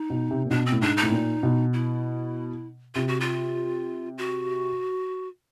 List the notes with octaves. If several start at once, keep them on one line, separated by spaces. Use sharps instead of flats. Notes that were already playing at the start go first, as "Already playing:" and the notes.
Already playing: D#4
B2
C3
A#2
B2 D4
C4
A2
G#2 D4
D#4
A2
A#2
B2
E4
C3 F4
F#4
F4
F#4